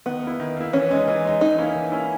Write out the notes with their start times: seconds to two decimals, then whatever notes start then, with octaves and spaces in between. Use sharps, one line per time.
0.06 D#3 B3
0.23 A#3 E4
0.40 D#3
0.57 A#3 E4
0.73 E3 C#4
0.91 G#3 D#4
1.08 E3
1.24 G#3 D#4
1.41 E3 D#4
1.58 A#3 C#4 E4
1.76 E3
1.92 A#3 C#4 E4